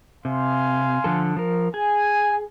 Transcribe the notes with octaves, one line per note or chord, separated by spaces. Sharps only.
C3 F5 G#5 C6
D3 F3 A4
F3 A#4
G#4 G#5